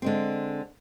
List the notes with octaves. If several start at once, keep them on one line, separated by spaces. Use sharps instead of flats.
D3 G#3 C4